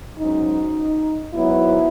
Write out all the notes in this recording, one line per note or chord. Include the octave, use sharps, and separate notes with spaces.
G#2 F#3 C#4 D#4
G#2 F#3 B3 E4